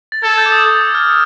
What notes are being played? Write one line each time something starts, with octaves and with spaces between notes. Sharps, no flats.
A6
A4 G#6
G6
D6
D#6
D#6
E6
F6
E6